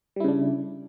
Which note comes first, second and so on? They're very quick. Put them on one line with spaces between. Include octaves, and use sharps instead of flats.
G3 E4 C#3 D4